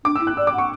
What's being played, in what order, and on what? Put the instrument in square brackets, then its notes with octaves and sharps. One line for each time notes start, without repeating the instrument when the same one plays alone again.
[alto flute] D4 [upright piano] D6
[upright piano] E6
[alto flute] E4
[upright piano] F#6
[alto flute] D5 [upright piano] E6
[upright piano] D6
[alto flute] F#5 [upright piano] C#6